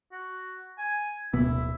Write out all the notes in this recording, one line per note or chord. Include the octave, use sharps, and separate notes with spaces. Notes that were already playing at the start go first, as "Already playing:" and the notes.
F#4
G#5
D1 B2 B3 E4